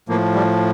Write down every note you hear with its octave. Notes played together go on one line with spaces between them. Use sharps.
A2 F3 A#3
G3